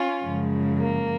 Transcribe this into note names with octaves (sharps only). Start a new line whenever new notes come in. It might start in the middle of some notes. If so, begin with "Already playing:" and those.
Already playing: C#4 F4
F#2 C#3 F3 G#3
A#3